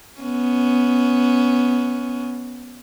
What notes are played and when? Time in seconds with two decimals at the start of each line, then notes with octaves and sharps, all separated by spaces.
0.21 B3 C#4